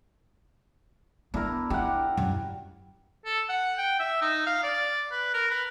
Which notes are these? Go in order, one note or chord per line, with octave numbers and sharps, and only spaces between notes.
B3 D4 E4 A#4
E4 G4 A#4 F#5
F#2
A4
F#5
G5
E5
D#4
F5
D5
B4
A#4
B4